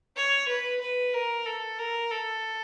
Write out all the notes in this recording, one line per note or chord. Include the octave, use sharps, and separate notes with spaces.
C#5
B4
B4
A#4
A4
A#4
A4